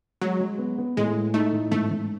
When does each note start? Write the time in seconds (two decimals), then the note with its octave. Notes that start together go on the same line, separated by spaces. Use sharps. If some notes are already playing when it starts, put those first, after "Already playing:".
0.21 F#3 G#3
0.40 G#3
0.58 B3
0.78 B3
0.97 A2 G#3
1.16 G#3
1.34 A3 D#4
1.52 A2
1.72 G#2 A3
1.91 G#2